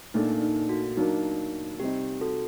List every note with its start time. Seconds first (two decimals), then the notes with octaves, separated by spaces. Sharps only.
0.14 A#2 A3 D4 D#4
0.42 D#4
0.69 F#4
0.97 F#3 A#3 D4 D#4
1.80 C3 G3 C4 D#4 G4
2.21 F#4 A4